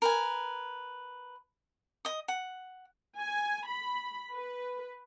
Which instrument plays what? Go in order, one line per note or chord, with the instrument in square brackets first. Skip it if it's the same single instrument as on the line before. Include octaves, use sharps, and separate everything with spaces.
[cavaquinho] A#4 B4 G#5
D#5 D#6
F#5
[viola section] G#5
B5
B4